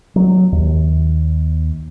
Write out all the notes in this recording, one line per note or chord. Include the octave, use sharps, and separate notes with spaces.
F#3
D#2